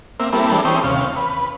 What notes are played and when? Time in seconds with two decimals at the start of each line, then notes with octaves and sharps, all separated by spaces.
0.20 A#3 C4 E5
0.33 G3 A#3 C4 E4 A4 B4
0.52 E3 G3 G#3 C4 D4 A4
0.65 E3 C4 G4 C5 C#5 D#6
0.84 D#2 C3 C#4 F5
1.16 B4